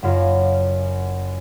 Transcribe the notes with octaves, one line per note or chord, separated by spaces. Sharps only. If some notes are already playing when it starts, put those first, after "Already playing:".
F#1 F#2 F4